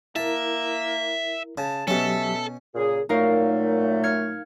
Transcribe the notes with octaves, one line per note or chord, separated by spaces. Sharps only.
A#3 E4 A#4 E5 A5
C#3 A5
B2 F#3 C#4 G4 A4 E5
A#2 C#3 G#4
A#2 F#3 A3 D#4 A#4 F5
F6 G#6 C#7